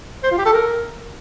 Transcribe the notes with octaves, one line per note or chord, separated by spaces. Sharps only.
C5
F4
G4
A4
A#4